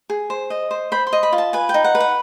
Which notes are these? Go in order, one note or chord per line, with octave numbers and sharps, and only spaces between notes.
G#4
C5
D#5
C5
C5 B5
C6
D#5
B5
F4
A5
B4 G#5
G5
D#4
F#5
B4
F#5